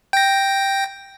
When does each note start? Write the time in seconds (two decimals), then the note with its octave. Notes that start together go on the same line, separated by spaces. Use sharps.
0.13 G5 A#6